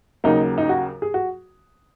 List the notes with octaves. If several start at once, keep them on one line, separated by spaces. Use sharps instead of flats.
D#2 C#3 F#3 A#3 D#4
D#4
F#4
G#4
F#4